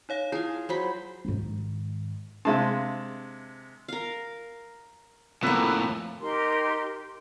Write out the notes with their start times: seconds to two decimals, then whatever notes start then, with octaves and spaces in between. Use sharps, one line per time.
0.09 D#4 C#5 F5
0.32 E4 F4 G#4
0.69 F#3 C5 B5
1.25 G#2 D#3
2.45 C3 G#3 D4 E5 F5 A5
3.88 A#4 F5
5.43 F2 A2 A#3 B3 B4 E5
6.21 D#4 G4 A#4 C6